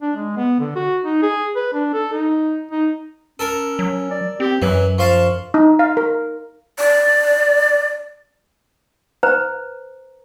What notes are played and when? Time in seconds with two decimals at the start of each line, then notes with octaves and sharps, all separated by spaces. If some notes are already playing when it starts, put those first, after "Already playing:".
0.02 D4
0.16 G#3
0.37 B3
0.59 D3
0.76 F#4
1.04 D#4
1.22 G#4
1.56 B4
1.73 D4
1.93 A4
2.13 D#4
2.72 D#4
3.39 C#4 A4 A#4
3.79 F#3
4.11 D5
4.40 C4 G4
4.62 F#2 E3 F#3
4.98 F3 F5 A5 C#6
5.54 D#4
5.79 F5
5.97 A#4
6.79 D5
9.23 B4 C5 A#5